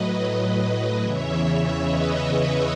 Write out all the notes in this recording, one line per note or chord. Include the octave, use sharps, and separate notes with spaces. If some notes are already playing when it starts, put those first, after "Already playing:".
Already playing: A2 F#3 B4 D#5
E2 C#3 E3 C#5 E5
B4 D#5